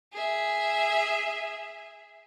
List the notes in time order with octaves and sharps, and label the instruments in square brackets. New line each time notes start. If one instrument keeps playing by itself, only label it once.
[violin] G#4 E5